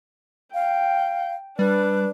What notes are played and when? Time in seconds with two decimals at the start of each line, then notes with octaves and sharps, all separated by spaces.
0.54 F5 G5
1.59 G3 D4 B4